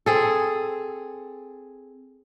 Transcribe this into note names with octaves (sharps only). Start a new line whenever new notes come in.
C4 G#4 A4